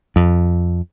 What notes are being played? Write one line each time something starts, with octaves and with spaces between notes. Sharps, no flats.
F2